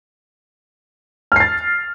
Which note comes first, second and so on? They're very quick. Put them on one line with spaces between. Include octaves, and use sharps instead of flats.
F6 C7 A6